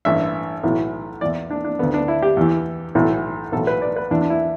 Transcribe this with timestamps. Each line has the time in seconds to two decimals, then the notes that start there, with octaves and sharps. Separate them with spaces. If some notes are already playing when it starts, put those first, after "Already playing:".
0.05 A1 G2 E3 E5
0.63 B1 A2 E3
1.21 E2 E3 D5
1.50 D4
1.65 D4
1.79 D3 B3
1.83 D2
1.94 D4
2.08 E4
2.22 G4
2.37 E2 E3
2.95 B1 A2 E3
3.52 B1 A2 E3 A4
3.67 B4
3.82 D5
3.96 B4
4.11 E2 E3 D4
4.21 D4
4.30 E4